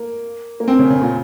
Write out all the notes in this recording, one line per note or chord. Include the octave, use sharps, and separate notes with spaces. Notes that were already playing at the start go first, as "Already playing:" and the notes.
Already playing: A#3
A#3
C4
C#3
C#3
A#2